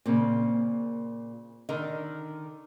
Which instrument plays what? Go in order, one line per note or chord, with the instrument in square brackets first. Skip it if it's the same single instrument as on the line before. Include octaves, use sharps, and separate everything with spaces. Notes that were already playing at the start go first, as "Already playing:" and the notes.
[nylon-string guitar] A#2 A#3 [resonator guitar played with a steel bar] C#3 C4
[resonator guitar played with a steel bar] D3 A#4 D#5 [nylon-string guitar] D#3